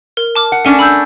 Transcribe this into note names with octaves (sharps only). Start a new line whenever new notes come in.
A#4
A5 D6 F6
F#5
A3 C#4 D4 F#5 G#5
B5 E6 G6